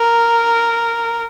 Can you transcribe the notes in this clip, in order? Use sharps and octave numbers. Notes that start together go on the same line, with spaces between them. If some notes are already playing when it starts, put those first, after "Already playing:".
Already playing: A#4